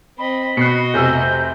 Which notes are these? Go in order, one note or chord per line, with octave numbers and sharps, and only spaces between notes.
C4 D#5 B5
B2 F#4 D#5 F#6 C7 C#7
F1 C3 E6 G6